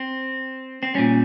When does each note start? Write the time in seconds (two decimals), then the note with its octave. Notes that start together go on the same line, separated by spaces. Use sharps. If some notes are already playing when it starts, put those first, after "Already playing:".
Already playing: C4
0.83 C4
0.94 A#2 G3 C#4